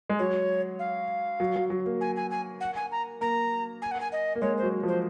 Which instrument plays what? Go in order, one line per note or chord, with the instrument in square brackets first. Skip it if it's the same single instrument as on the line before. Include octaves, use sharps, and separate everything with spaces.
[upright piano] G#3
[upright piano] F#3 [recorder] C#5
[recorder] F5
[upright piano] F#3
F#3
F#3
A#3
[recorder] G#5
G#5
G#5
F#5
G#5
A#5
[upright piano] A#3 [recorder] A#5
[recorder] G#5
F#5
G#5
D#5
[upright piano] A#3
[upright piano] G#3 [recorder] C#5
[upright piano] F#3 [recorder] C5
[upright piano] F3 [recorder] C5